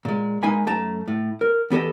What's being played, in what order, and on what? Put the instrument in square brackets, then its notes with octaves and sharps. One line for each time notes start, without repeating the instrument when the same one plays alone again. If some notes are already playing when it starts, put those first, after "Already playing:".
[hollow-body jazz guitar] A#2 G#3
G#3 A#3 D#4 G#5 B5
F#2 A3 A5 A#5
A2
A#4
E2 B3 G4 A4 D#5